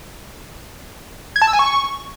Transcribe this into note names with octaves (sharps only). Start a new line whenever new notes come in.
G#6
A5
E6
G#5
C#6